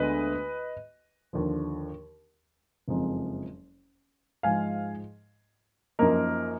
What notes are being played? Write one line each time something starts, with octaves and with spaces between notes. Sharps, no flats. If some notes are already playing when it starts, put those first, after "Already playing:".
Already playing: D2 D3 G#3 B3 B4 D#5
D#2 D3 F3
F#1 F2 F3 G#3 D#4
G#2 F3 G#3 F5 G#5
F#2 F3 A#3 D#4 A#4